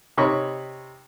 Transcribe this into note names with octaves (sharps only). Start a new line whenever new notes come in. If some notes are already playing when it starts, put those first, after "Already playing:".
C3 D#4 C#5 B5 C#6